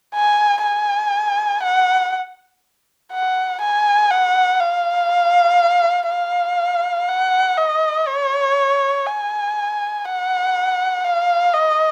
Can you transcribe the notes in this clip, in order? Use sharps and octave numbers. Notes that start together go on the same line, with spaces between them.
G#5
G#5
F#5
F#5
G#5
F#5
F5
F5
F#5
D#5
C#5
G#5
F#5
F5
D#5